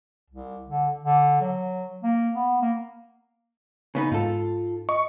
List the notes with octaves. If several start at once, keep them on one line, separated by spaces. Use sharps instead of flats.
C2
D3
D3
F#3
A#3
B3
A#3
C#3 B3 D#4
G#2 F4 A4
D#5 C#6